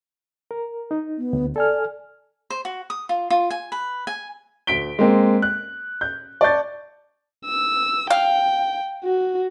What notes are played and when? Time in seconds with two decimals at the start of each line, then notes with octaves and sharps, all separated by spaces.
0.51 A#4
0.91 D#4
1.18 B3
1.33 D2
1.56 A4 D5 G#5 F6
2.50 C5
2.65 F#4
2.90 D#6
3.09 F4
3.30 F4
3.51 G#5
3.72 B4
4.07 G#5
4.67 D2 B6 D7 G7
4.99 G#3 A#3 C4
5.42 F#6
6.01 G6
6.41 D5 A5 C#6 G6 A6
7.45 E6
8.10 F5 G5
9.04 F#4